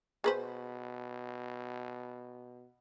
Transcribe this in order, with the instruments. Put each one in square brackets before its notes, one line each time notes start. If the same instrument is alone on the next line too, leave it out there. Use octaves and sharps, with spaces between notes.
[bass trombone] B2 [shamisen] G#4 B4 C5